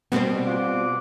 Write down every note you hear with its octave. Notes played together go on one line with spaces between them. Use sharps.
B2 G3 C4 C5
F4 F#5 D6